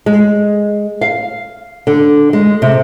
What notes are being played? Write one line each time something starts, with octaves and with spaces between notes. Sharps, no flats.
G#3
F5
D3
G#3
C3